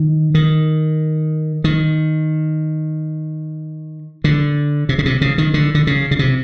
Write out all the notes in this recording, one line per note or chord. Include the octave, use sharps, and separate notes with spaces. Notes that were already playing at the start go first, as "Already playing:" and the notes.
Already playing: D#3
D#3
D#3
D3
C3
C#3
C3
C#3
D#3
D3
D3
C#3
C#3
C3